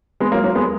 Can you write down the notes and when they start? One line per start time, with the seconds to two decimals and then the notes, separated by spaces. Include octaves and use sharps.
0.20 G#3 B3
0.32 F#3 A#3
0.44 F#3 A#3
0.55 G#3 B3